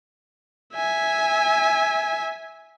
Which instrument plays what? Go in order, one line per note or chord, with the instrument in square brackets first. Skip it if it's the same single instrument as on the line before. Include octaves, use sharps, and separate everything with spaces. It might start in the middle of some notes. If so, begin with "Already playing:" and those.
[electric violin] E5 G#5